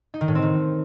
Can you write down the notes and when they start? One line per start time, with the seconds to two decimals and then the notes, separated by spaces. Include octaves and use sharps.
0.14 D#4
0.21 D#3
0.28 A2
0.35 C4
0.42 D#3